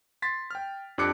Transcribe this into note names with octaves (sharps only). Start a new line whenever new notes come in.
C6 A6 B6
G5 F6
F2 D4 G4 D6 F#6 C#7